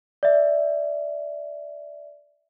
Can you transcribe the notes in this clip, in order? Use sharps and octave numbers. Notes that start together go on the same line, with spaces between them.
D5 E5